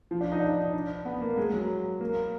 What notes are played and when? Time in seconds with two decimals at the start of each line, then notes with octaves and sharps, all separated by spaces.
0.11 F3
0.21 D4
0.32 D#4
0.40 D4
0.49 D#4
0.73 D4
1.05 B3
1.21 A#3
1.37 G#3
1.54 F#3
2.01 A#3